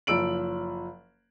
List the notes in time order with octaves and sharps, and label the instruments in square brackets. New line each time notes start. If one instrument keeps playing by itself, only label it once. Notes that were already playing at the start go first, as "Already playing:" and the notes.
[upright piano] F#1 F3 E6 D7 F#7